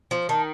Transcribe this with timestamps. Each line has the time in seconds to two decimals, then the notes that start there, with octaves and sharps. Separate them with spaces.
0.11 F3
0.29 D#3 A5